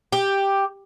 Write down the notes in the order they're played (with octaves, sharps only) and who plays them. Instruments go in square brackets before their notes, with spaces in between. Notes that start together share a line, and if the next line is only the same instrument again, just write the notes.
[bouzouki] G4